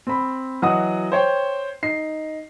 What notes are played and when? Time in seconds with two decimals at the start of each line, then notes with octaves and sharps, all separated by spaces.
0.07 C4 B5
0.62 E3 F#3 F#4 D#5 F#5 D#6
1.12 C5 C#5 G5
1.83 D#4 C7